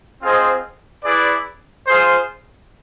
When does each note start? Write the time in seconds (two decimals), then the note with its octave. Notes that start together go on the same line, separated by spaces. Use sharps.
0.22 C4 F4 G#4 C5 D#5
1.04 E4 G#4 B4 D5
1.87 F4 G#4 C5